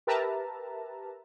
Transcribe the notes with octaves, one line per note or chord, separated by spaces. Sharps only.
G4 A#4 B4 E5 A5 A#5